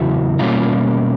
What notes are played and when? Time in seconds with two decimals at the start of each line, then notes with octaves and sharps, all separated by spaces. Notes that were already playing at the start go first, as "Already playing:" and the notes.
Already playing: E2 C#3 F#3 E4 F#4
0.39 B2 G3 A#3 C#4 D#4 F4